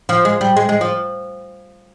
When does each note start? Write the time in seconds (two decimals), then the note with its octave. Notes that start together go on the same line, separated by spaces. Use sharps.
0.09 F3
0.25 G#3
0.41 G3
0.57 G#3
0.69 G#3
0.81 F3